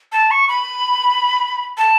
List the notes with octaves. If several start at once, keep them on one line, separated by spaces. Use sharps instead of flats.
A5
C#6
B5
A5